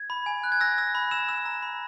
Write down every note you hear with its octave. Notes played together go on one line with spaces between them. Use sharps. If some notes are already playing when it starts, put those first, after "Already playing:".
Already playing: G#6
B5
G#5
F#6
G#6
E6 A#6
E6
B5
E6 E7
E6
A#5
B5